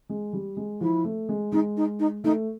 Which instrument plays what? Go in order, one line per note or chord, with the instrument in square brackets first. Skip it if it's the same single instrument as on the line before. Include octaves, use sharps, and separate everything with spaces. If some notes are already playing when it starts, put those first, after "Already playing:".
[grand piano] G#3
G3
G#3
[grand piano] F3 [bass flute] E4
[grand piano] A3
G#3
[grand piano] G#3 [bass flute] D#4
[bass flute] D#4
D#4
[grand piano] A3 [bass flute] D#4